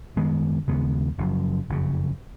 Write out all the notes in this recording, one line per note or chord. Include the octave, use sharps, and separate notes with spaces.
F#2 D#3 G#3 B3
D#2 C#3 G#3 B3
F#1 F#2 F3
F#1 F2 C#3